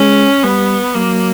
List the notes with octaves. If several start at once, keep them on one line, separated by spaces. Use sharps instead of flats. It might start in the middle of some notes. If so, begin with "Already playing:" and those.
Already playing: G#3 C#4
G3 B3
F#3 A#3